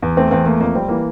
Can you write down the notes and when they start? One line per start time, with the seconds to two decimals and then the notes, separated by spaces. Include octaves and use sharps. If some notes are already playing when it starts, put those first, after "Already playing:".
0.02 E2
0.17 A3 C4
0.31 E2 C4
0.46 A3 A#3
0.60 F2 A#3
0.75 G3 C4
0.88 E3 A#3